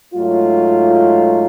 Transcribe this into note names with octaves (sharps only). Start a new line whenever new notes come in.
G#2 F#3 A3 F4